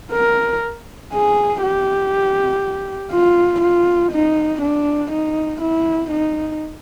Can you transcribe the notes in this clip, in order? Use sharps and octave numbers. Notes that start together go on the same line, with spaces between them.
A#4
G#4
G4
F4
F4
D#4
D4
D#4
E4
D#4